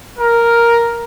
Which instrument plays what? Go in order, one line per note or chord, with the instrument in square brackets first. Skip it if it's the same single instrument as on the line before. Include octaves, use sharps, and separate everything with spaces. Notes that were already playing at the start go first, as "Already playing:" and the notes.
[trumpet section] A#4